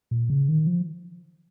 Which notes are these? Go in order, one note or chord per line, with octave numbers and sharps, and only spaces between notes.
A#2
C#3
D#3
F3